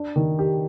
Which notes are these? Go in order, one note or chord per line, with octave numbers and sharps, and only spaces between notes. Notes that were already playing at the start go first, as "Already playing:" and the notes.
Already playing: D4
D#3
G4